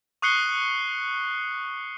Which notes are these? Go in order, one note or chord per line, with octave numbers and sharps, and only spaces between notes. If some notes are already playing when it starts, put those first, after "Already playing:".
C#6 D#6 F#6 C7 C#7 G7